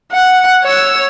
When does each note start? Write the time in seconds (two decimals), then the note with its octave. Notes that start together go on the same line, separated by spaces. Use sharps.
0.12 F#5
0.64 C#5 E6